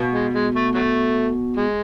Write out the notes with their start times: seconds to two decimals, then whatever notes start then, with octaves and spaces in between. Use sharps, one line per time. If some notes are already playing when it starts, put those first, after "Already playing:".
Already playing: B2
0.13 G#3
0.33 G#3
0.54 A3
0.74 F#3 A3
1.57 G#3